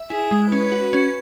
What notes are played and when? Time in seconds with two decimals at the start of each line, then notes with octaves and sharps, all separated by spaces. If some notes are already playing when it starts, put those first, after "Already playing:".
Already playing: E5
0.10 E4 G#4
0.31 G#3
0.51 C#4 B4
0.72 F#4
0.93 C#4